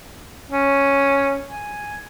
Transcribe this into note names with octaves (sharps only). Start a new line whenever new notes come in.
C#4
G#5